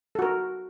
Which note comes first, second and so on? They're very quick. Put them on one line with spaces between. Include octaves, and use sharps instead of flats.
A4 F#4 A#4